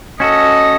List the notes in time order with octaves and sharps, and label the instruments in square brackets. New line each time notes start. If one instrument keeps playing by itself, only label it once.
[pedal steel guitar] C#4 F#4 A4 [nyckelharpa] D#5